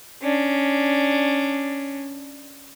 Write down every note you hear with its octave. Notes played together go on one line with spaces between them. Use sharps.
C#4 D4